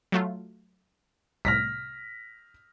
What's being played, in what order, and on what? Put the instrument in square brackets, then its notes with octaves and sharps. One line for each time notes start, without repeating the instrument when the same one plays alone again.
[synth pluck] F#3 A3 F4
[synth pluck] C2 A2 [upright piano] F6 A#6 B6